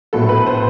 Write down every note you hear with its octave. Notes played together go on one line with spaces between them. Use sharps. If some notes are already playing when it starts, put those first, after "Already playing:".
A#1 A2 F#3 B3 A4
B4
C5